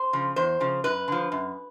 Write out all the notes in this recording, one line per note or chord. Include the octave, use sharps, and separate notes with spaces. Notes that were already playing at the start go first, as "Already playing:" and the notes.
Already playing: C5
C#3 F3
E2 C5
C#3 F3
F#2 B4
D3 F3
F#2